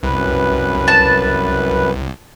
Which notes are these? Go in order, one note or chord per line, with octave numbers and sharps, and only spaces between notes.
C2 F#2 B4
A5